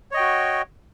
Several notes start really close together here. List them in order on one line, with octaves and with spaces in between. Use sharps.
C#5 D#5 G5 F#4